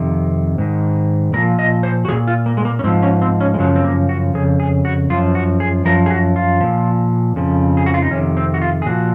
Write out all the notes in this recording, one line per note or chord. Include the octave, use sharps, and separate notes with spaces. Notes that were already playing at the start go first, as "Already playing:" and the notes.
Already playing: F2 C3 D#3
G#2 D#3
A#2 F3 A#4
D#5
C5
F#4
F3 G#4
A#2
F4
A#3
G#3
A#3
C#4
G#2 F3 C4
C#4
C4
C#4
G#3
F#2 C#3 F3 F#3
C4
A#3
F#4
F2 C#3 G#4
G#4
F#4
F#2 F3 F4
F#4
G#4
F#2 F3 A#4
G#4
F#4
F4
A#2 F3
F2 C#3 F3
G#4
F#4
F4
D#4
F2 C3 D#3 C#4
C4
F#4
F4
G#4
A#2 F3 F#4